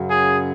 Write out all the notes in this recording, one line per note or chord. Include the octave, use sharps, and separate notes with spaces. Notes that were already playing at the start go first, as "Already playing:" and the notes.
Already playing: F#2 C#3 F#3
G#4